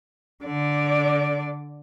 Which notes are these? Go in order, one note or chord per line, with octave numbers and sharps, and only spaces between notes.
D3 D5